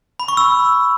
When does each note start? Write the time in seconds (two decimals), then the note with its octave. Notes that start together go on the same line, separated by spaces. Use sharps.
0.20 B5
0.28 C#6
0.37 E6